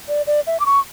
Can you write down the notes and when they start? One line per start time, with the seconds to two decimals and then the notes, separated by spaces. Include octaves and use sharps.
0.08 D5
0.27 D5
0.47 E5
0.60 D6
0.66 C#6